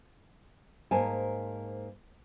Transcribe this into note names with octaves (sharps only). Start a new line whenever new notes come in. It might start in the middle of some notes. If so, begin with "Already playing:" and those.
G#2 A#3 C5 G#5 A5